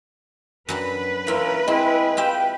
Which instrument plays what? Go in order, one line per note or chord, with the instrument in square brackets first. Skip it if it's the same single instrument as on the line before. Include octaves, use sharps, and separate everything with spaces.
[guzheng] F#2 F#3 D4 [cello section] B4
[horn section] E3 C#4 A#4 [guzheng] A#3 E4 F4
[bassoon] G#3 [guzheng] C4 [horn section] E4
[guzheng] F4 G4 E5 [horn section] G5